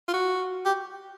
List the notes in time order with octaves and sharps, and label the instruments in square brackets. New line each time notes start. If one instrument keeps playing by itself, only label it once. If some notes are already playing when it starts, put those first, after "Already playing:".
[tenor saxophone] F4
F#4
G4